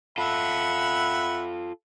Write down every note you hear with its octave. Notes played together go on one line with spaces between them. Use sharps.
F4 A4 E5 F#5 B5